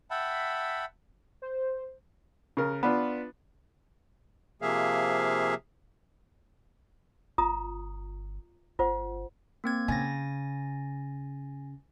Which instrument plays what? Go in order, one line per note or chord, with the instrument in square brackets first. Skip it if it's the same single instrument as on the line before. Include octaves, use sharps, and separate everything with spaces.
[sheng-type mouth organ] E5 F#5 G5 A5 B5
[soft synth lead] C5
[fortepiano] C#3 A#4
B3 D4 F4 B4
[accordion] C3 F3 A#3 G#4 E5 F5
[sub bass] G1 [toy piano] F4 A#5 D#6
[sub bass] G1 [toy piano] F4 C5 F#5
[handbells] A#3 C4 G#6
[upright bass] C#3 [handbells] G#5 A6 A#6